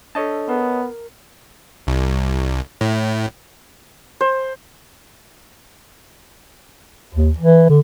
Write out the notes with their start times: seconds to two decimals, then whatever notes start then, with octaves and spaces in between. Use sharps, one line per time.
0.15 D4 A4 C#5 D#5 A5
0.49 B3 A#4
1.87 C2
2.81 A2
4.21 C5
7.14 D#2
7.38 E3
7.70 D3